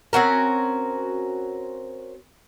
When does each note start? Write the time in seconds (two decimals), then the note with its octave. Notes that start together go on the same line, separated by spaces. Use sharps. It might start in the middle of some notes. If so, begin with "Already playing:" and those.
0.13 C4 C#4 F#4 A#4